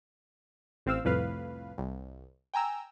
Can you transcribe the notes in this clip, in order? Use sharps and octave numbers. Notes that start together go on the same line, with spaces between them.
A1 C4 F5 E6
C2 F2 A2 B4 F5
C2
G5 G#5 A#5 E6